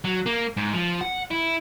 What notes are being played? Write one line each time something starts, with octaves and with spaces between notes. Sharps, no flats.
F#3
A#3
G#2
F3
F#5
E4